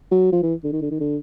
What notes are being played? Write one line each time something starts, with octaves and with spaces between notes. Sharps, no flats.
F#3
F3
E3
D3
D#3
D3
D#3
D3